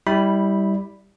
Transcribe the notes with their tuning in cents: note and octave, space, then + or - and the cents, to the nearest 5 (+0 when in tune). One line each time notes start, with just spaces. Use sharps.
G3 +0 E4 -25 B5 +0